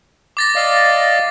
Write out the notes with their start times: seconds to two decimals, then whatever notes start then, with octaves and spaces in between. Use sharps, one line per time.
0.37 D6 A6 A#6
0.55 D5 D#5 F5